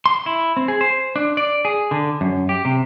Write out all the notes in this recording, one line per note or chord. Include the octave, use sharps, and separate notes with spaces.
C6
E4
C4
G#4
C5
D4
D5
G#4
D3
F#2
G4
C3